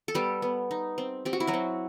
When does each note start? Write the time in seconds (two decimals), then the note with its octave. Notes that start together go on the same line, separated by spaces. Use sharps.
0.08 A4
0.15 G3 B3 G4
0.42 B3
0.71 D#4
0.98 C4
1.25 C4 G4
1.33 F#4
1.40 E4
1.47 F#3 F#4
1.53 C4